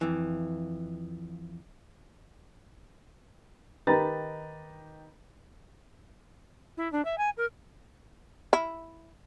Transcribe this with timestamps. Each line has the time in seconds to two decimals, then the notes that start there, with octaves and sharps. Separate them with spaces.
0.01 F2 E3
3.87 D#3 D#4 G4 B4 A#5 A6
6.77 E4
6.92 D4
7.05 E5
7.18 G#5
7.37 A#4
8.53 E4